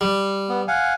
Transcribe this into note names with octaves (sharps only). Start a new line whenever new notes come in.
G3
B3
F5 F#5 G#5